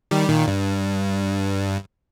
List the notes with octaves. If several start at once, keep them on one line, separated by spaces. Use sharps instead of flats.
D#3 G3
A#2 D#3
G2